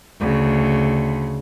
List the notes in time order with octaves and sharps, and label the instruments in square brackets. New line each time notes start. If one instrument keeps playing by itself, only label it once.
[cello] D2 C#3